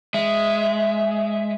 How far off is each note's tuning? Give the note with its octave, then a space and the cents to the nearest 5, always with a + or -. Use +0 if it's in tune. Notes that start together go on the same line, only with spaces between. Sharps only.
G#3 +0 E5 +5